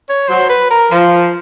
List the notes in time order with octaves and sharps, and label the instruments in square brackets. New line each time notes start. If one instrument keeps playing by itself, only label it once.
[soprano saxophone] C#5
[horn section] F#3 [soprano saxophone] C5
[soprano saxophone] B4
A#4
[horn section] F3